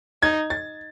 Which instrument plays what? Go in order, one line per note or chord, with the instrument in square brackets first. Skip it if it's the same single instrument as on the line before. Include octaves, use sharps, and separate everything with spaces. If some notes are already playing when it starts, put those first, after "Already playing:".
[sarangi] D#4 [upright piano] G#6
[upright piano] A6